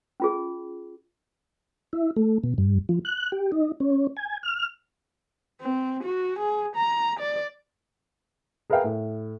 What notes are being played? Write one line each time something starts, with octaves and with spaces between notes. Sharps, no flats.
C#4 F4 G#4
E4
A3
B2
G2
F3
F#6
G4
D#4
C#4
G#5
F6
C4
F#4
G#4
A#5
D5
G#4 A#4 B4 E5 F5 G5
A2